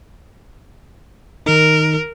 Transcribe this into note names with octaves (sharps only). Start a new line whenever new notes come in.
D#3 D#4 A#4